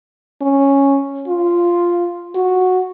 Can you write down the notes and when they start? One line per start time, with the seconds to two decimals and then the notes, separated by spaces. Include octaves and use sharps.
0.41 C#4
1.28 F4
2.35 F#4